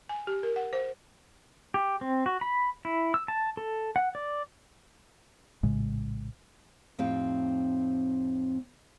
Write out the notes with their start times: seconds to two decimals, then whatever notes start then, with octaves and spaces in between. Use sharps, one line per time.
0.09 G#5
0.27 G4
0.43 A#4
0.56 F#5
0.73 C5
1.74 G4
2.01 C4
2.26 F#4
2.41 B5
2.85 E4
3.14 E6
3.28 A5
3.57 A4
3.96 F#5
4.15 D5
5.63 A#1 A2 C#3 G#3
6.99 F2 A2 C4 D#4 G4 F5